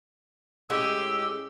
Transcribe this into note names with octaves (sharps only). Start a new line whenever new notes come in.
A2 G#3 C#4 G4 E6